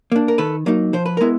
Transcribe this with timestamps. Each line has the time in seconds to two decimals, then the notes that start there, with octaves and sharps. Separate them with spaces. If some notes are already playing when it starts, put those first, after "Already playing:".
0.12 A#3 D4
0.28 A#4
0.38 D#3 A4 B4
0.66 F#3 A#3 D#4
0.93 F3 C5
1.06 B4
1.17 G#3 B3 E4 A#4